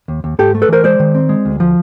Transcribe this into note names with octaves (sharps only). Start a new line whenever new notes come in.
D#2
D#2
G#2 G4 A4
A3
A4 B4
E3 A#4 C5
G#3 C5 D5
D#3
C4
G#3
D2
F3